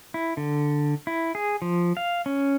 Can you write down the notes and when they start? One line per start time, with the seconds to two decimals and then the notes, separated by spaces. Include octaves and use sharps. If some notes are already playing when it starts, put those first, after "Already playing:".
0.14 E4
0.37 D3
1.07 E4
1.35 G#4
1.62 F3
1.97 F5
2.26 C#4